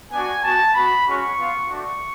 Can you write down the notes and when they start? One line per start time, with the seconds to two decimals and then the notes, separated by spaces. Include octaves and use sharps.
0.11 B3 D4 F#4 G#5
0.43 B3 F#4 A5
0.74 B3 F#4 B5
1.05 G#3 C#4 F#4 C#6
1.37 B3 F4
1.69 A3 D4 F#4 C#6